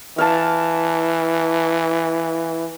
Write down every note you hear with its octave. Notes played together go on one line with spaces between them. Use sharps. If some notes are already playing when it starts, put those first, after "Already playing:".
E3 F5 A5